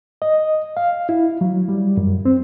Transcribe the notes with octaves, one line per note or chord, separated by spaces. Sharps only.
D#5
F5
E4
F#3
G3
F#2
C4